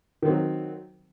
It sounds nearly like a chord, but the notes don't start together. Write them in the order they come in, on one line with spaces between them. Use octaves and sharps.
D#3 C4 F#3